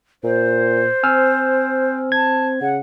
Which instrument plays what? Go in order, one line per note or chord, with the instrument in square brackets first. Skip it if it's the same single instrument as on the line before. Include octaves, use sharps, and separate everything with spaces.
[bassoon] A#2 [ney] C5
[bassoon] C4 [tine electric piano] G#5 E6 F6
[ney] A5 [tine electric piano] G#6
[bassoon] C#3 [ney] F#5